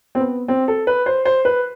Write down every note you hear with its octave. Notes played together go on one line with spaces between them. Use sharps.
C4
B3
C4
A4
B4
C5
C5
B4